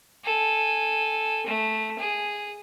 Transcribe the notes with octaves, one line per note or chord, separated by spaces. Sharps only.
A4 G#5
A3
G#4